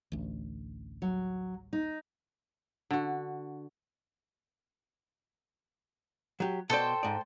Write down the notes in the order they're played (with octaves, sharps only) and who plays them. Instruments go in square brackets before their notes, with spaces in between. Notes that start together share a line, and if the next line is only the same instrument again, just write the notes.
[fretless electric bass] A1 D2
[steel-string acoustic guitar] F#3
D#4
[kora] D3 F#4
[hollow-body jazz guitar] F#3 G4
[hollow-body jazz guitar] B2 D5 [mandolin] A4 C5 G5
[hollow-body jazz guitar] G#2 D5